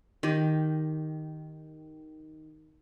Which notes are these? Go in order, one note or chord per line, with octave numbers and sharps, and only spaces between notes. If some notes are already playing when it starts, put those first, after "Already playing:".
D#3 G4